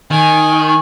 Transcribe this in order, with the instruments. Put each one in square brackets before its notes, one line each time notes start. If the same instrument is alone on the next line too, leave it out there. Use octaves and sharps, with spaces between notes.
[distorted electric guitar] D#3 [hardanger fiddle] G#5